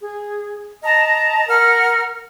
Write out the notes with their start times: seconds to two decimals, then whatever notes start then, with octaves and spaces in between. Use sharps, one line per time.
0.02 G#4
0.83 D#5 A5 A#5
1.49 A#4 F#5 F6